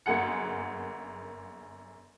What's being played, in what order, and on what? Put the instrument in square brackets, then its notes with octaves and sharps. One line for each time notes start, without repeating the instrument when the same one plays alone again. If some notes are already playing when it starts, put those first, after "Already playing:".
[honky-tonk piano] G1 F#2 A#3 G#4 F#5 C#7